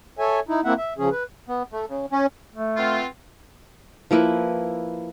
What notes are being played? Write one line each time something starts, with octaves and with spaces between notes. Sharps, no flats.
A4 C#5 E5 G#5
D#4 E4
A#3 C4 E4 E5 F#5
E5
C#3 F3 C#4 G#4
B4
B3
A3
C#3
C#4
A3
B3 C4 F4
F3 A#3 E4 B4